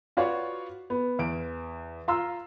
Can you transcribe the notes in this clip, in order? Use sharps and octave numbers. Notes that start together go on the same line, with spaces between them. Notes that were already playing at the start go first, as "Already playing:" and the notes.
F4 F#4 B4 C#5 D5 F5
B3
E2 D7
F4 F5 A#5 C6 E6